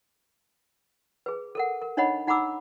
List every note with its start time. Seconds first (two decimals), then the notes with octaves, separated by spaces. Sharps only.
1.26 G#4 B4
1.55 A4 A#4 F#5
1.82 A#4
1.97 D4 D#4 C#5 D#5 F#5 B5
2.27 D#4 F#5 A#5 B5 D6 E6